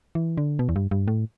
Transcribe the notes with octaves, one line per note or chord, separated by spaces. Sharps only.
E3
D3
B2
E2
G2
G2
A2